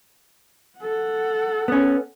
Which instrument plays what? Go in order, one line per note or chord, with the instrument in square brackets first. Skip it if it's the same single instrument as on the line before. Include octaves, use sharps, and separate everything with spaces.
[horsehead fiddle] A4 F#5
[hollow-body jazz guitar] B3 C#4